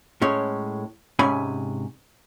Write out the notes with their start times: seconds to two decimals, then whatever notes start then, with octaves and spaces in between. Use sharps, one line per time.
0.22 A2 G#3 C#4 C#5
1.19 G#2 C3 C#4 G#5 B5